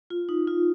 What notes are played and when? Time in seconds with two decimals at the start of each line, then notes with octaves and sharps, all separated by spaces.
0.10 F4
0.29 D#4
0.47 F4